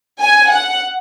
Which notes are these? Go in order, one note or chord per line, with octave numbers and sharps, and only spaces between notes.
G#5
F#5